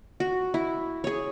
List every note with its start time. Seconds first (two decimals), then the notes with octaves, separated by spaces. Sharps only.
0.20 F#4
0.54 E4
1.04 G#4 C#5